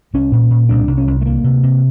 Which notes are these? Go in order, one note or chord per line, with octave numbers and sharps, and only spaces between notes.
C2 C#4
A#2
A#2
C2 D4
C2
C#4
C2
A3
D2 A#3
C3
C3